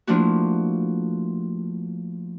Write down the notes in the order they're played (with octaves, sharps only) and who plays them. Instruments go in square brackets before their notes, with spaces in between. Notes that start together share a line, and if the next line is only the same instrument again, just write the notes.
[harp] F3 A3 A#3 D4 E4 F#4